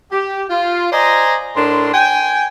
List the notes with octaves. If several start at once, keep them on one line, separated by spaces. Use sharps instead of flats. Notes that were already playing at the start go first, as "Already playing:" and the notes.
G4
F4
C5 D5 D#5 G#5 A#5
A2 D4 A#4 C6
G5 G#5